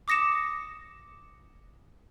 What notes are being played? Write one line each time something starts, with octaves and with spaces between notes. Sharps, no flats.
D6 D#6 A#6 C#7 E7